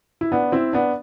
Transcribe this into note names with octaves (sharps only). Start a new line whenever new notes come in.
E4
B3 D4
C4 E4
B3 D4